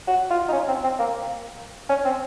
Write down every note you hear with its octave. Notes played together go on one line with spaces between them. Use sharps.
F#4
F4
D#4
C#4
C4
C4
A#3
C#4
C4